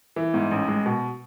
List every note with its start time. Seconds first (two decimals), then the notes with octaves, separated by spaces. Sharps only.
0.16 E3
0.34 G#2
0.51 A1
0.68 G#3
0.86 B2